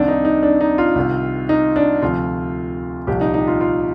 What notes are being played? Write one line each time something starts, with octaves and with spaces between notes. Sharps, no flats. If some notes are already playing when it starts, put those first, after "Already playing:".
Already playing: C2 C3 D#3 D4
D#4
D#4
D4
D#4
F4
C2 C3 D#3
D#4
D4
D2 C3 F3 F4
C2 A#2 F3 G4
D#4
D#4
F4
F4